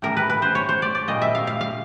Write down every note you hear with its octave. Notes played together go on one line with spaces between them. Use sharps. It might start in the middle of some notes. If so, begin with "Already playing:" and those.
A2 E3 G3 A#4
B4
B4
C5
C#5
C5
D5
D5
A#2 G3 D#5
E5
F5
F5
F5